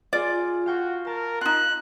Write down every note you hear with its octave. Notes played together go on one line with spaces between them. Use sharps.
F4 G#4 D5
F#4 F5 G5 C#6
A#4 A5
D#4 F4 F#6